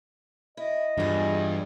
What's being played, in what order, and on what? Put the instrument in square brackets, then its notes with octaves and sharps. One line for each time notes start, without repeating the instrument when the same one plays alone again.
[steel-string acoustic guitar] E4 [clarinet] D#5
[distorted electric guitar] E2 [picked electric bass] G2 [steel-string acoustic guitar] F4 G#4